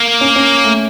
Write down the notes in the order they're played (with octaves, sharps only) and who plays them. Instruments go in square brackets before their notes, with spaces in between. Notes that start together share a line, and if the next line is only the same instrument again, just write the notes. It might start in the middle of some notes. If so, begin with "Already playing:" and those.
Already playing: [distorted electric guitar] A#3
[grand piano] C#4
C#4
A3